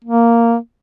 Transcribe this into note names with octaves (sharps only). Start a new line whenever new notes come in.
A#3